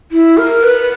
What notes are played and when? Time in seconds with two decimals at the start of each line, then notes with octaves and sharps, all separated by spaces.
0.12 E4
0.37 A#4
0.63 B4